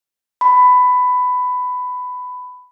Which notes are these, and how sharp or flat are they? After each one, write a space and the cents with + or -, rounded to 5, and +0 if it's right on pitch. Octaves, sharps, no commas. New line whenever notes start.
B5 +15